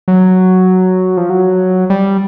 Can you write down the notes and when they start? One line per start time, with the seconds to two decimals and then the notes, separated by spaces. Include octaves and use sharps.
0.08 F#3
1.17 F3
1.30 F#3
1.90 G3